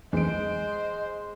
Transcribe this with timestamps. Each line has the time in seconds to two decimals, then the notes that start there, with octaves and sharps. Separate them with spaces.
0.13 B1 F2 E3 G#3 C5 D#5 D7